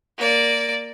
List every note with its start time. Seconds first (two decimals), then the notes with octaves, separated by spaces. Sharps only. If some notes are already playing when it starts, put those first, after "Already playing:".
0.18 A#3 D5